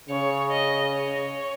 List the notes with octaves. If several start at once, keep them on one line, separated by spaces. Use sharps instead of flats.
C#3 C#5
D#5
C#5